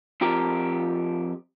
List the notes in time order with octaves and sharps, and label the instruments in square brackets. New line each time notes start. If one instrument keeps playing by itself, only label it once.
[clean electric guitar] F2 F3 G4 A#4